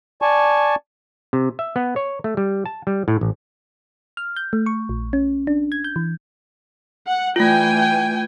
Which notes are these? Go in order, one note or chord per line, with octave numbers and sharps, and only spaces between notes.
D5 G#5 A5 C#6
C3
E5
B3
C#5
A3
G3
A5
G3
A2
A1
F6
G6
A3
C#6
A#1
C#4
D4
G#6
G6
E3
F#5
E3 A3 F4 G5 G#5